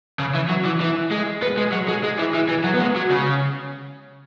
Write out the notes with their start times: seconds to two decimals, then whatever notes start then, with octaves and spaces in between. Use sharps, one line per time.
0.19 C#3
0.35 E3
0.49 F#3
0.65 E3
0.81 E3
1.11 G#3
1.42 B3
1.57 G#3
1.72 F#3
1.88 G#3
2.04 G#3
2.19 E3
2.35 E3
2.49 E3
2.64 F#3
2.74 B3
2.80 G#3
2.96 F#3
3.10 C#3